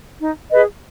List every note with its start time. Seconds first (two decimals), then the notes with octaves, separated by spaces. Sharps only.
0.20 D#4
0.51 G#4 B4 D#5